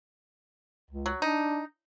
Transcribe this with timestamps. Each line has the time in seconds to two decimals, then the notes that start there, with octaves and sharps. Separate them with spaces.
0.91 C#2
1.06 F#3
1.22 D4 D#4